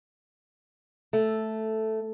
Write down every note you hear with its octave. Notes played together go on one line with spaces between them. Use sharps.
A3